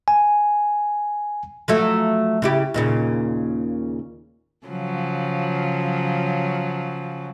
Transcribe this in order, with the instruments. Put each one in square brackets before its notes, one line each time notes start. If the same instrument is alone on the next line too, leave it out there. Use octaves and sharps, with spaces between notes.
[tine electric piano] G#5
[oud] F3 F#3 A3
C#3 E4 G4
D#2 A#2 C#3
[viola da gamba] C#3 F3 F#3